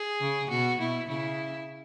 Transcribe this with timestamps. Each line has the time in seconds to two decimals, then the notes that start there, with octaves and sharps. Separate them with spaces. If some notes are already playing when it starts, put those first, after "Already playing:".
Already playing: G#4
0.21 C#3
0.50 B2 F#4
0.80 B2 E4
1.08 C#3 E4